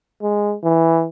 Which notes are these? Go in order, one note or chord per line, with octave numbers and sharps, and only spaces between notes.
G#3
E3